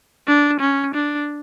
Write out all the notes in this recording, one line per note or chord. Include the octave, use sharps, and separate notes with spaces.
D4
C#4
D4